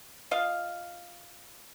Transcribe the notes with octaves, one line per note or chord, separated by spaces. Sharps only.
F4 D#5 F5